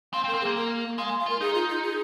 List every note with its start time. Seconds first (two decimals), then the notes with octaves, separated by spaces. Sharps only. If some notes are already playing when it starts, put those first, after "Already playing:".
0.13 C4 F5
0.24 C4
0.28 A#4
0.34 C4
0.41 A#3 G#4
0.56 A#4
0.98 G#3 F5
1.08 G#5
1.20 F5
1.26 F4 A#4
1.41 D#4 G#4
1.55 F4
1.69 F4
1.83 G#4